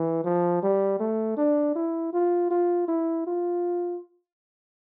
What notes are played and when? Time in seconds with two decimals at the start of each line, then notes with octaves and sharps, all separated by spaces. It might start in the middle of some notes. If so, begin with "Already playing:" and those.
Already playing: E3
0.24 F3
0.63 G3
0.99 A3
1.37 D4
1.75 E4
2.13 F4
2.51 F4
2.88 E4
3.27 F4